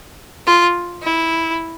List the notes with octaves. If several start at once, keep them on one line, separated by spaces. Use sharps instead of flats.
F4
E4